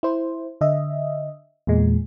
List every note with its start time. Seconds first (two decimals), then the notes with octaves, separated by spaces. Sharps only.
0.03 E4 C5
0.61 D3 D#5 E5
1.67 E2 A#2 G#3